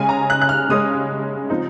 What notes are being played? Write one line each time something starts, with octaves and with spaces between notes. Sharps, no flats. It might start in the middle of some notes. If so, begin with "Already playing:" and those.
Already playing: C#3 G#3 C#4 G#5
A#5
F#6
F#6
F6
C#3 G#3 C#4 D#6
F3 C4 D#4